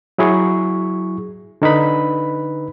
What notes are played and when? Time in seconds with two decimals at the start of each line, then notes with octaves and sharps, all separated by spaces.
0.18 F#3 E4 G#4 C#6
1.62 D3 D#4 B4 B5